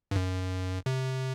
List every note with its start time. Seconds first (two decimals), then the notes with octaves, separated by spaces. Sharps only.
0.11 G2
0.16 F#2
0.86 C3